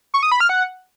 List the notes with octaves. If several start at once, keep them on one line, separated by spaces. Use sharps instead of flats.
C#6
D#6
B5
F6
F#5